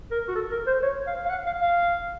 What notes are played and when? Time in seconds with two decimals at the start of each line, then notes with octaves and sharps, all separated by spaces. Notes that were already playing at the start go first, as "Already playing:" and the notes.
0.11 A#4
0.28 F#4
0.35 A4
0.51 A#4
0.67 C5
0.83 C#5
1.07 F5
1.25 F5
1.30 F#5
1.46 F5
1.61 F5